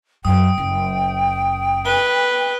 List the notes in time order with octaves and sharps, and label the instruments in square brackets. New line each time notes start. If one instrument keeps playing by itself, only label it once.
[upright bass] F#2 [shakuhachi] G5 [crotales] D#6
[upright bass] F#1
[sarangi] B4 [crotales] G7